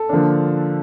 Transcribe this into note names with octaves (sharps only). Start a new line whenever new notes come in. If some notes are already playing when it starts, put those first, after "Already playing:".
Already playing: A4
D3 F3 A#3 D4